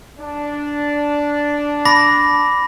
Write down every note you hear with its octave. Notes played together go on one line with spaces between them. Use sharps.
D4
B5 D6 A#6